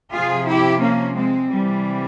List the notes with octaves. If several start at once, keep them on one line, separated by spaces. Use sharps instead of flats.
C3 F3 F4 G#4
E4 G4
A#3 C#4
G#3 C4
C3 E3 G3